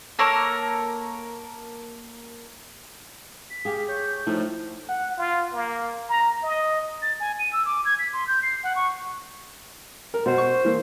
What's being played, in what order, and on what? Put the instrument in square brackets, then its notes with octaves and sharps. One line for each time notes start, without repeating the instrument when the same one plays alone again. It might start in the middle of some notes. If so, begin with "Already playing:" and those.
[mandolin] A#3 A4 A#4 C#5
[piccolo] B6
[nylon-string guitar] G4 G#4 [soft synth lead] F5
[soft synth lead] C#5 [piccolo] G6
[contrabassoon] A2 [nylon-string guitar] F3 [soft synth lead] D#4
[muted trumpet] F#5
F4
A#3
A#5
D#5
[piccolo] A6
G#5
D#7
E6
D6
G#6
B6
C6
G6
C7
F#5
C#6
[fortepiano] A#4
[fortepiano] B2 [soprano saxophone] C5
[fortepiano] C#6
E3 A#3